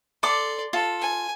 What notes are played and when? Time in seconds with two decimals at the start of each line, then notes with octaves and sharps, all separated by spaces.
0.23 A4 D5 C6 D6
0.73 F4 A4
1.01 G#5